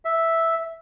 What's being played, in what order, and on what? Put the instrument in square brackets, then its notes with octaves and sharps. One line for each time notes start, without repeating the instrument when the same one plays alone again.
[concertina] E5